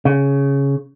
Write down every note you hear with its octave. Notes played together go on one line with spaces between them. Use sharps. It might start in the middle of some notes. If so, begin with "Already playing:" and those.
C#3